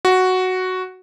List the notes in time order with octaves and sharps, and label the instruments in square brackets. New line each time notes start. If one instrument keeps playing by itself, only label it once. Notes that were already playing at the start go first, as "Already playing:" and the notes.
[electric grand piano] F#4